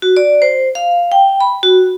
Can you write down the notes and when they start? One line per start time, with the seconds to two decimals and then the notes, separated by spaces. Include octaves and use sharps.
0.02 F#4
0.16 D5
0.42 C5
0.75 F5
1.12 G5
1.40 B5
1.63 F#4